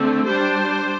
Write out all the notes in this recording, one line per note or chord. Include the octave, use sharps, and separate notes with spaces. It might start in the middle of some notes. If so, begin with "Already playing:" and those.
Already playing: D3 A3 C4
G3 D4 C5